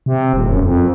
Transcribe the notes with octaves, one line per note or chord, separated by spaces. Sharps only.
C3
D#1
F#2
F2